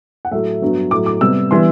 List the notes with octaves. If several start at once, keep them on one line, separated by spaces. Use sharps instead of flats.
F#5
A2 F#3 A3 E5
G2 F#3 B3
A2 F#3 A3 D6
D6
C3 G3 B3 E6
E3 G3 B3 C6